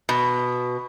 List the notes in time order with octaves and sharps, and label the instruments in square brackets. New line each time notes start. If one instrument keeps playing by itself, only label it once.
[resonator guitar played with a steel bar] B2